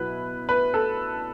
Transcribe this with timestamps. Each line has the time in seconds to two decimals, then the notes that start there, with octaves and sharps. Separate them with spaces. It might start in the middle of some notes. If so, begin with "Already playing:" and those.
Already playing: B2 F#3 B3 E4 B4
0.49 B4
0.74 A4